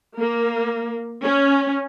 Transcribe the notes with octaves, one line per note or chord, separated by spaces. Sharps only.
A#3
C#4